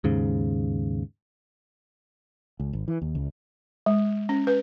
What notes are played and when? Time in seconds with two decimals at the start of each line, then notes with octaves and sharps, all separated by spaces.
0.04 D#2 G#2 C#3
2.60 C#2
2.73 G#1
2.88 E3
3.02 D#2
3.15 C#2
3.86 G#3
4.29 C#4
4.47 B4